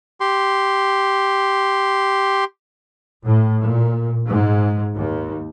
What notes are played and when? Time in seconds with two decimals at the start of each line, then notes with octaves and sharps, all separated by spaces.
0.20 G4 C6
3.25 A2
3.64 A#2
4.28 G#2
4.95 D#2